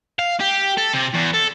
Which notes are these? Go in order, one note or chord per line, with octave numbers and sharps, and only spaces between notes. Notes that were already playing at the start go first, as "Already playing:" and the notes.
F5
G4
A4
C3
E2
A4